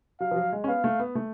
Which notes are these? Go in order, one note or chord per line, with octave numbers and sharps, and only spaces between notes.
F#3 F5
F3
F#3
G#3
C#4
B3 F5
A3
B3
A3